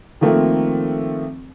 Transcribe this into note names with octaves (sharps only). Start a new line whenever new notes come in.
D#3 F3 A3 A#3 C4